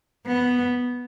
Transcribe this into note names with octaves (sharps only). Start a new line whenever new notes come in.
B3